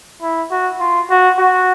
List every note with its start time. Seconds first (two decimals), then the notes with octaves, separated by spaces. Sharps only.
0.22 E4
0.51 F#4
0.80 F4
1.10 F#4
1.38 F#4